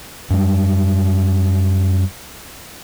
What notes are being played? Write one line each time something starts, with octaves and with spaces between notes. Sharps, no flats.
F#2 G3